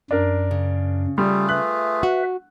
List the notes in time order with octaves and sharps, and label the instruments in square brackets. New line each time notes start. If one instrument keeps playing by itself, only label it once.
[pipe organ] F#2 [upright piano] D4 A#4
[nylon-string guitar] C#3
[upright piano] G3 [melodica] A3 F4 G#4
[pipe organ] B4 E5 [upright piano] F#6
[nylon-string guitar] F#4